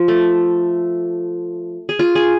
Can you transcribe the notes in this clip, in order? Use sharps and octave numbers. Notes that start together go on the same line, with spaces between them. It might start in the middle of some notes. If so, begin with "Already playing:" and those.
Already playing: F3
A3
G#4
F4
G#4